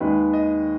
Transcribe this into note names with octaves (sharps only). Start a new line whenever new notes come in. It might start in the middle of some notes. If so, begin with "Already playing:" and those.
D#2 D#3 G#3 B4
D#5